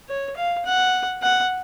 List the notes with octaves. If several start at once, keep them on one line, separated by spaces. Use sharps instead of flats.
C#5
F5
F#5
F#5